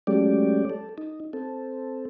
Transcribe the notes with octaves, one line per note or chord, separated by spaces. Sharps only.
F#3 G#3 A3 C#4 G4 D5
A4
D#4
C4 A4